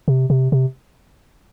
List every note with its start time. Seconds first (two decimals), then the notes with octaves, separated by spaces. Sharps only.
0.08 C3
0.30 C3
0.52 C3